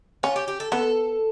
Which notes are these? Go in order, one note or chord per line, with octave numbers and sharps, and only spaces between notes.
C#4 F4
G4
G4
A4
B3 A4